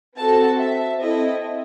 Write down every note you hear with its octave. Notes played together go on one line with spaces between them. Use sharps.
C4 F#4 A4 A5
E5
C4 E4 A4 D#5